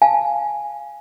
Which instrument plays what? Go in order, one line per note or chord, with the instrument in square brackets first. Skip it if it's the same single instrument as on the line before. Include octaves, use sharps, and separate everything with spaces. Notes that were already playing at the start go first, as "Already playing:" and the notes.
[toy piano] F5 G#5 A5